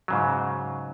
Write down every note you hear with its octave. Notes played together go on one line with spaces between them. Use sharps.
G#2 C#3 F#3